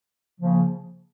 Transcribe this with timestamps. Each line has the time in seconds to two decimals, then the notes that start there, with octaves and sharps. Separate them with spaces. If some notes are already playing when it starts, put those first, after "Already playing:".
0.38 C#3 F3 A#3